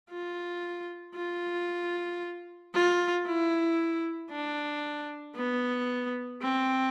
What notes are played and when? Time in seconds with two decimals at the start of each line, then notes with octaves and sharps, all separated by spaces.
0.11 F4
1.15 F4
2.74 F4
3.26 E4
4.31 D4
5.36 B3
6.42 C4